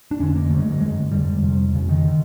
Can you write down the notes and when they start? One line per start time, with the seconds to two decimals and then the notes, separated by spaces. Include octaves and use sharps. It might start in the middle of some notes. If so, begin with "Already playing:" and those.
0.11 D4
0.20 F2 D3 C#4
0.35 A#3
0.50 D3 A3
0.53 G2
0.60 G#3
0.71 F#3
0.81 F#2 D3 G#3
1.11 F2 D3 G3
1.43 F2 C3
1.73 F2 C#3
1.89 D#3
2.05 D3